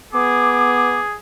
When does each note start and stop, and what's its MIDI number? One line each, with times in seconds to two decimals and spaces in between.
0.13 1.00 59
0.13 1.18 68
0.13 1.00 86